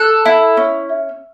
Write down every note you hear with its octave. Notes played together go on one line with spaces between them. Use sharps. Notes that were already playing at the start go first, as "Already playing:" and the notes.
Already playing: A4 F#6
E4
C#4